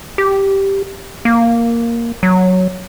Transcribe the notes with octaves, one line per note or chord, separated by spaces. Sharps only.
G4
A#3
F#3